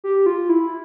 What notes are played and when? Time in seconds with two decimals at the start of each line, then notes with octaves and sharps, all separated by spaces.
0.04 G4
0.26 F4
0.49 E4